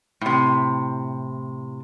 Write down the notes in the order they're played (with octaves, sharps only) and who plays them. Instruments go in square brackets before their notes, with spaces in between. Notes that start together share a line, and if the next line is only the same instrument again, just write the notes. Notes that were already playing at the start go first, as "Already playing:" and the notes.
[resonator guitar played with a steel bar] A2 C3